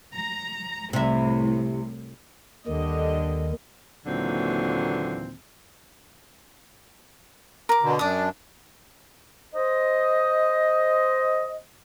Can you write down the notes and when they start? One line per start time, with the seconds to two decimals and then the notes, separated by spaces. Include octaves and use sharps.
0.16 A#5
0.93 C2 A2 C3 E4
2.67 D#2 D3 D#3 G3 D#5
4.06 D#2 A#2 D3 E3 F#3 C4
7.69 A#4 D6
7.83 B2 D3
7.99 F#2 D4 D5 D#6
9.55 C5 D#5